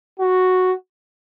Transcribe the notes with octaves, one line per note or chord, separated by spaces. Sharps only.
F#4